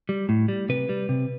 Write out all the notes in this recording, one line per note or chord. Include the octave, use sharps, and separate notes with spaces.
G3
A2
G3
C3 B4
G3
C3